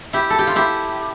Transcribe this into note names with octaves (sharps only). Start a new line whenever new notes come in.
E4 G4
A4
G4
F4
E4 G4